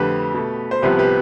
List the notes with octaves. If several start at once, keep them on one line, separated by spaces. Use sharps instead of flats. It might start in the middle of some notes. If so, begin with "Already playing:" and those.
Already playing: F2 D3 A3 G4 B4
B2 A3
C5
C2 C3 F3 B3 G4 B4
G4 B4